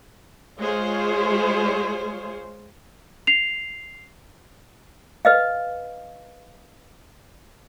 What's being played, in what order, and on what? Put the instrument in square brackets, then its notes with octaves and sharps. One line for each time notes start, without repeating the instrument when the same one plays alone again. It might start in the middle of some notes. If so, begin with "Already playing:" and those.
[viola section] G#3 F4 G#4 C5 C#5
[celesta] C7 F7
[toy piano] B4 D#5 F5